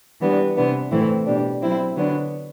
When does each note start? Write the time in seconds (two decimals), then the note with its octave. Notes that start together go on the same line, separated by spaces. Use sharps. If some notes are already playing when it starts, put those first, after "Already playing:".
0.21 E3 G3 B3 D4
0.56 C3 E3 B3 D4
0.91 A2 E3 A3 C4 E4
1.26 B2 G3 D4
1.61 F#3 C4 E4
1.96 D3 F#3 B3 D4